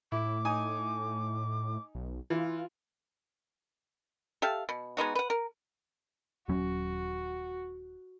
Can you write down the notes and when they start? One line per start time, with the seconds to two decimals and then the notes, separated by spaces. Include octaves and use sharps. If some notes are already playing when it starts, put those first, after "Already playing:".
0.12 A2 E4 D6
0.45 D#4 G#5 D#6
1.95 B1
2.30 E3 F4
4.42 G4 A4 E5 F5
4.69 B2
4.97 G#3 B3 D#4 F#4
5.15 B4 F#5
5.30 A#4
6.49 D#1 F#3 C#4 F#4